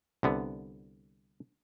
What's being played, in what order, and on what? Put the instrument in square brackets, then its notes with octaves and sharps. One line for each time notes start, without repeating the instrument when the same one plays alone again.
[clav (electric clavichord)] C2 D3 B3